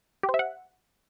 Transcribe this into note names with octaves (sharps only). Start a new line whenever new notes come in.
G4
C5
E5
F#5